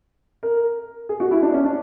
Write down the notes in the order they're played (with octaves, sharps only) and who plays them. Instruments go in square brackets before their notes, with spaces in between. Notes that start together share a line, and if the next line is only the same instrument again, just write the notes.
[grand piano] A#4
G#4
F#4
E4
D4
C#4
D4